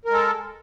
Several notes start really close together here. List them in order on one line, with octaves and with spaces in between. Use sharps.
A#4 G#3 A4